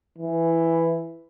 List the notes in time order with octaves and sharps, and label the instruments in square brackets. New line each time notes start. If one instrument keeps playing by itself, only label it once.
[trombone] E3